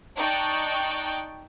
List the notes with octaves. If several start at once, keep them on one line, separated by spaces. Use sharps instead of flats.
D#4 D5 G5 A5 C#6 F#6